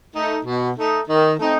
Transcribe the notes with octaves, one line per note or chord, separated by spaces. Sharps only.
A3 D#4
B2
A3 D#4
D#3
A3 C4 D#4